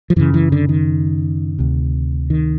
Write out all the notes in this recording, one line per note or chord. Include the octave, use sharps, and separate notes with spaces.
F3
F#2 C#3 E3
E3
D3
D#3
D2 C3
D#3